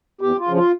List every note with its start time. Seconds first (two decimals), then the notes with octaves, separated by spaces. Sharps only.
0.21 E2 G4
0.39 F4
0.47 C#3 F3
0.56 F4